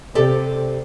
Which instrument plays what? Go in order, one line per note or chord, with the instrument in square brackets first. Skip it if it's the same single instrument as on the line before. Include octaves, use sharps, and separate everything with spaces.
[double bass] C3 [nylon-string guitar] G4 A4 D5